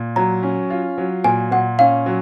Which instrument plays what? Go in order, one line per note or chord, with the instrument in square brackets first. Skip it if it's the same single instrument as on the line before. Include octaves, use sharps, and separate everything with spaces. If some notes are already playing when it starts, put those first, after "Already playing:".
Already playing: [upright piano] A#2
[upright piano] F#3 [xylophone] A#5
[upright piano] C#4
F4
F#3
[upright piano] A#2 [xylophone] G#5
[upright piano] A#2 [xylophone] F#5
[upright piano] C#4 [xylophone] F5
[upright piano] F#3